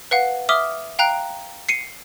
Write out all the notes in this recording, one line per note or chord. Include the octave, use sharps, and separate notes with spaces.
B4 F5 F#5
E5 D6 D#6 F6 G7
F5 G5 A#5 F#6 D7
C7 C#7 D#7